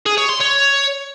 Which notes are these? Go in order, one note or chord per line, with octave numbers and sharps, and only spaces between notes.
G#4
C#5
C6
C#5